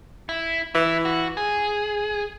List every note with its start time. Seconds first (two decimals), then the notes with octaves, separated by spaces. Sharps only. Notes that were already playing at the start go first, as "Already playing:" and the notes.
0.29 E4
0.75 E3 E4
1.05 F#4
1.37 G#4